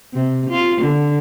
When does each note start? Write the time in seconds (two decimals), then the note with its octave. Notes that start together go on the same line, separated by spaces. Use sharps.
0.13 C3
0.50 F4
0.81 D3